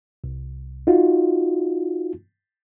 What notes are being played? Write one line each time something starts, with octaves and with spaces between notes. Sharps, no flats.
C2
D#4 F4 F#4